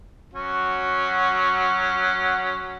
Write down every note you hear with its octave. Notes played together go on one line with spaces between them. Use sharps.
F#3 C#4 F#4